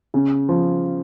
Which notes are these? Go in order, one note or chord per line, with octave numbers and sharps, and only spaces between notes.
C#3
F3